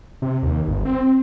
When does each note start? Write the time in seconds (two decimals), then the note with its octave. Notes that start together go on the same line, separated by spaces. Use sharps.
0.22 C3
0.43 D#2
0.67 G1
0.85 C4